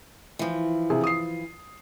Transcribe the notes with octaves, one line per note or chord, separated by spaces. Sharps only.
E3 F3
C3 G#4
D#6 C7